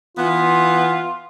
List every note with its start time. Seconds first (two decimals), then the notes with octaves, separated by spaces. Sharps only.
0.17 E3 B3 F4